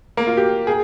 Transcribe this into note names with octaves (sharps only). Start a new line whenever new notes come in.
A#3
F4
G4
G#4